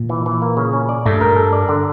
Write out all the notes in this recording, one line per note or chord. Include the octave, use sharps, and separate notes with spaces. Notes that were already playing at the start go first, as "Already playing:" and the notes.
Already playing: A#2
E3
E3
A#3
C#3
C#4
D5
G2 A3
A#4
A4
D5
D3